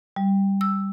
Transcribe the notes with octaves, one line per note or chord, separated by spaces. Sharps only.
G3
E6